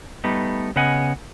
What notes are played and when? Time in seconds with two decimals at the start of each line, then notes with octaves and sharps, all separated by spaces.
0.24 G3 A3 B3 D#4
0.76 C#3 B3 D#5 F#5 G#5